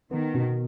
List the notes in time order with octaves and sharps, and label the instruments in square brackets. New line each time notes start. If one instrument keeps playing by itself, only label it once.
[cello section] D#3 [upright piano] B3
[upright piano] B2